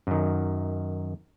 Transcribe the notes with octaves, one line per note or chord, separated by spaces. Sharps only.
F#2 D#3